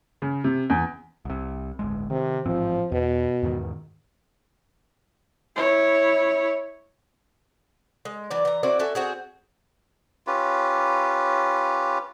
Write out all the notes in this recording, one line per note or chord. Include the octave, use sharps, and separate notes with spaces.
C#3
C3
E2
C2 C3
D1 G1 G#3
C3 D#3
A1 G#2 F3 C4
E2 B2
E2 G#2 D#3
E4 C#5
G#3
E3 F#3 D5
E3 A#5
C4 E4 F#4 D5
F#4 A4 E5 G#5
C4 F#4 G#4
C#4 F4 G4 B4